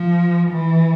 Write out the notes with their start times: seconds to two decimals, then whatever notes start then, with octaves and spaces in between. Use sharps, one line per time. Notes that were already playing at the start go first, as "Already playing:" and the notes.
Already playing: F3
0.50 E3